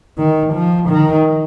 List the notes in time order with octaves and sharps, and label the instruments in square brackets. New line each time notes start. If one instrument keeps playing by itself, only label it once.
[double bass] D#3
F3
D#3